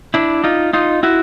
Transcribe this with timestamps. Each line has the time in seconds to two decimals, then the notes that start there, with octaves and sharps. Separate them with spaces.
0.14 D4 E4
0.44 D#4 F4
0.73 D#4 F4
1.03 E4 F#4